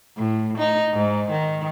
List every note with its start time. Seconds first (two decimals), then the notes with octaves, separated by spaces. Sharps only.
0.17 A2
0.58 D#4
0.93 G#2
1.31 D#3